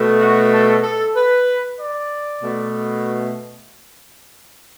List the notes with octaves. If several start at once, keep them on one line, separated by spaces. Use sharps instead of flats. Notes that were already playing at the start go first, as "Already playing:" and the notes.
Already playing: B2 A3
F#4
A4
A4
B4
D5
B2 A3